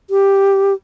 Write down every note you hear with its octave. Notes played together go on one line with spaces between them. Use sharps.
G4